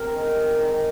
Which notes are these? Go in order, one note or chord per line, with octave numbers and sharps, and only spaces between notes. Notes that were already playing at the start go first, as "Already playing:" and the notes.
Already playing: C3 A#4
D#3 G#3
C3
D#3 G#3